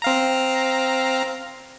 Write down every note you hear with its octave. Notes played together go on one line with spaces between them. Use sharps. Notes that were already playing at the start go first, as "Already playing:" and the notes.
C4 F5 A#5